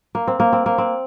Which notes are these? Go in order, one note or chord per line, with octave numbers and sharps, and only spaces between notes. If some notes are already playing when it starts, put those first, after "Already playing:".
A#3
C4
A#3
C4
A#3
C4